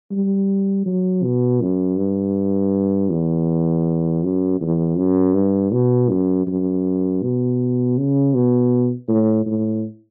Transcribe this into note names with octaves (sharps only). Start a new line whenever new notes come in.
G3
F#3
B2
F#2
G2
E2
F#2
E2
F#2
G2
B2
F#2
F#2
B2
C#3
B2
A2
A2